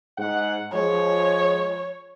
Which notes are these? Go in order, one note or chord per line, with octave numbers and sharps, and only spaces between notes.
G#2 F#5
F3 G#3 C#5